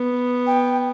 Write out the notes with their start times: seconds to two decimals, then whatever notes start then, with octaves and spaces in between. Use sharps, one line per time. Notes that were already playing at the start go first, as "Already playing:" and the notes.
Already playing: B3
0.47 G5